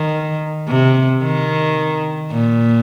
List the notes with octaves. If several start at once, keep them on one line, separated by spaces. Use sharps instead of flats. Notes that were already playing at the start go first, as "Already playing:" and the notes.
Already playing: D#3
C3
D#3
A#2